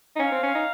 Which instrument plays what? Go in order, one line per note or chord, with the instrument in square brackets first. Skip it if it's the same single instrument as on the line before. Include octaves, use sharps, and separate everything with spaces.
[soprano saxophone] D#4
[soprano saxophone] C#4 [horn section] F5
[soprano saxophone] C4
C#4
D#4